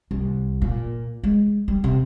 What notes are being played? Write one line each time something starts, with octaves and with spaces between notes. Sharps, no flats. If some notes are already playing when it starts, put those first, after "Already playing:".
C2
A#2
G#3
G3
C3